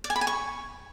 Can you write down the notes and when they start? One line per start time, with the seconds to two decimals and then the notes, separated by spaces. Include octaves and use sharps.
0.04 D5
0.10 G#5
0.16 B5
0.21 G#5
0.27 C#6